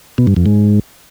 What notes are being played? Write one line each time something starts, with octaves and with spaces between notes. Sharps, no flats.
B2
G2
F2
G#2